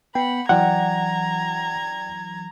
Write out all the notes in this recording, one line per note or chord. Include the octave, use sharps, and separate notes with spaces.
B3 F#5 G5 B5
E3 F#3 D5 F#5 G5 A#5 G#6